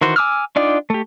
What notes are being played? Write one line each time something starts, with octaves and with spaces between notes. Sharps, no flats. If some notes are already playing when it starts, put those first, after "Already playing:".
D#3 E3 F#4 C5
G#5 D6 E6 F6
D4 D#4 F4 D5 G5
A3 G4